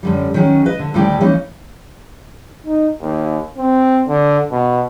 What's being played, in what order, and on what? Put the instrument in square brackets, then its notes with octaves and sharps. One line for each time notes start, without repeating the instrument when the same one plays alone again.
[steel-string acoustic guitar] F#2 D3 G3
D#3 F#3 C#4 G#4
B4 D#5
D3
D2 A2 D#3 G3 E4 G4
E3 A#3 C#4 D#4
[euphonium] D#4
D#2
C4
D3
B2